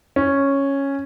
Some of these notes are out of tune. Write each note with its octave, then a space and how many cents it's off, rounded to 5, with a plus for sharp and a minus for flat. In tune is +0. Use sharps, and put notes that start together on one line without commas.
C#4 -5